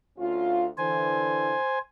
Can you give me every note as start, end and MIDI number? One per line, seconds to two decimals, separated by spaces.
0.18 0.65 38
0.18 0.65 61
0.18 0.65 65
0.78 1.55 50
0.78 1.55 52
0.78 1.79 72
0.78 1.79 80